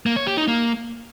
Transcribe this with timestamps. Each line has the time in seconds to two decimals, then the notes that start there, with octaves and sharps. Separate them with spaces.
0.06 A#3
0.16 C#5
0.27 G4
0.37 D#4
0.47 A#3